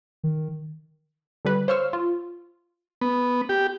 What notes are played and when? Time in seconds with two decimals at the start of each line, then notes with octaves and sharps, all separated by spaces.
0.24 D#3
1.45 D3 G3 B4
1.68 C5 C#5 F5 C#6 E6 F6
1.93 F4
3.01 B3
3.49 G4